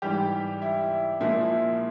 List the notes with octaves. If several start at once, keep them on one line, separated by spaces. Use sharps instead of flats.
G#2 E3 G3 G4
E4
A#2 F3 G#3 E4